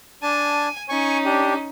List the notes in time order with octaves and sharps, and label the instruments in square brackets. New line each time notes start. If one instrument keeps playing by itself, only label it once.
[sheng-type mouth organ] D4 A5 [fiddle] G#5
[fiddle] C#4 D#4 [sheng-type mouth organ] G#5 C#6
[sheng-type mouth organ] D4 G4